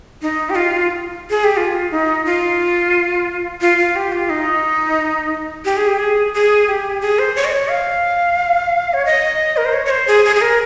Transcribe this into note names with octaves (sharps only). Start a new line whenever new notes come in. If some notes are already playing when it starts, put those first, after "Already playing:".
D#4
G4
F4
G#4
G4
F4
D#4
F4
F4
F4
G4
F4
D#4
G4
G#4
G4
G#4
G#4
G4
G#4
C5
C#5
D#5
C#5
F5
C#5
D#5
A#4
C5
C#5
C#5
C5
G#4
G#4
G#4
A#4